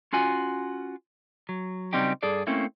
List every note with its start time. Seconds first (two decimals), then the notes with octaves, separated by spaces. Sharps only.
0.13 C#4 F4 F#4 G#5
1.49 F#3
1.93 C#3 F#3 G3 C4 D#4 G4
2.23 G2 G#4 A4 D5
2.47 A3 A#3 C4 C#4 E4